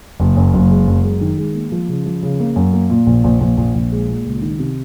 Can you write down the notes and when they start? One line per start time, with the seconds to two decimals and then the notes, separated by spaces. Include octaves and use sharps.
0.20 F#1
0.37 F#2
0.54 F#1
0.70 G#3
0.87 F#2
1.04 G#3
1.21 D#3
1.37 G#3
1.55 A#3
1.72 F3
1.89 C#3
2.06 F3
2.23 C#3
2.40 A#3
2.56 F#2
2.73 A#3
2.90 A#2
3.07 A#1
3.24 A#1
3.41 A#1
3.58 A#1
3.75 A#1
3.92 G#3
4.09 A#2
4.26 C#2
4.42 D#3
4.59 C3